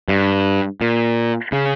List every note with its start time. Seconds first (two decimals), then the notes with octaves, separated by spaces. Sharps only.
0.08 G2
0.81 A#2
1.52 C#3